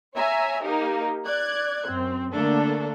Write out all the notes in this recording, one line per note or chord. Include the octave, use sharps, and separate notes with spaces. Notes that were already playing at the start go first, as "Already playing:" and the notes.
C#5 E5 G#5 A#5
A#3 D#4 G4 A#4
D5 F#6 G#6
F#2 C4
D3 A3 A#3 D4 A4